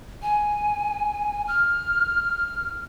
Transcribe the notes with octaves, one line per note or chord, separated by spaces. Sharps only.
G#5
F6